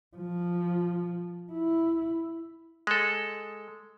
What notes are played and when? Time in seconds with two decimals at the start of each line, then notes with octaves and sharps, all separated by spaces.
0.17 F3
1.52 E4
2.87 G#3 A4